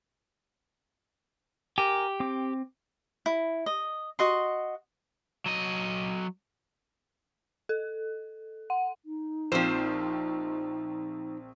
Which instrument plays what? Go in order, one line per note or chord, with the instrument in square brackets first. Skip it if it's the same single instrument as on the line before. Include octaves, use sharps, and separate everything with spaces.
[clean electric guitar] G4 [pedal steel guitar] A#4 G#5
[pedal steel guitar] C4 D6
[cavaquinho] E4
D#5
F#4 D#5 C6
[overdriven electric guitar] F#3 D#5
[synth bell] A4
F#5
[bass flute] D#4
[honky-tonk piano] A#1 C4 [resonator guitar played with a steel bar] F3 C5